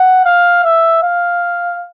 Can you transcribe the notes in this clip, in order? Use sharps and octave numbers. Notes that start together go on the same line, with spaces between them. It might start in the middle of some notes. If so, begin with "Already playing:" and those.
Already playing: F#5
F5
E5
F5